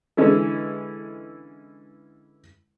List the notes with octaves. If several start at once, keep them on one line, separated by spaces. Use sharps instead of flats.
D3 E3 G#3 C#4 E4 A4